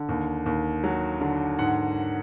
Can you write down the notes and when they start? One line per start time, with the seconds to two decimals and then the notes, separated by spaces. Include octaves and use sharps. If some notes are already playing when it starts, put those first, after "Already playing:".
Already playing: D3
0.09 D#2
0.46 D#2
0.84 F#3
1.21 D3
1.59 G#2 F#5